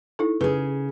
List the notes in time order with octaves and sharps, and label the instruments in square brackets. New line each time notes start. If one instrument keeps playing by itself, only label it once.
[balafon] D#4 E4 A4
[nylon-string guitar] C#3 G#4 [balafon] B4